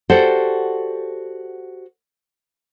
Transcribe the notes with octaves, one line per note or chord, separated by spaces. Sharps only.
F#4 G4 A4 C5 D5 F#5